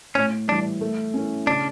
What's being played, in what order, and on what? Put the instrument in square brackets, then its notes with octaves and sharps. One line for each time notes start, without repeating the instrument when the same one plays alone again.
[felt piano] A2 [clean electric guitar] C#4
[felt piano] E3 G3 [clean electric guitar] D4
[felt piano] A3
C#4 E4 A4
[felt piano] C#3 [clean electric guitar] D4